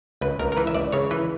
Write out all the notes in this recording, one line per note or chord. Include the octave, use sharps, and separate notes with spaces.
C#2 B4
C#2 A#4
A#4
E3 B4
E5
C#2 D5
C#3 C#5
E3 B4